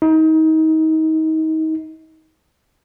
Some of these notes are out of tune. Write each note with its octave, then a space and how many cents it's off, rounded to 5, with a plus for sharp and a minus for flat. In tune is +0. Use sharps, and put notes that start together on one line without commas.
D#4 +30